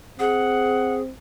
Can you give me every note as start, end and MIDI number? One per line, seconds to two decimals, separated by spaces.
0.19 1.11 60
0.19 1.01 68
0.19 0.94 78